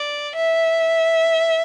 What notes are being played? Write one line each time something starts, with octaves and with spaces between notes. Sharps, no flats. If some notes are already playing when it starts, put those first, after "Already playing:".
Already playing: D5
E5